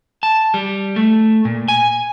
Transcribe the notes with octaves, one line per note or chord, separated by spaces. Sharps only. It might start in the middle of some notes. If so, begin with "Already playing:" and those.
A5
G3
A3
A#2
G#5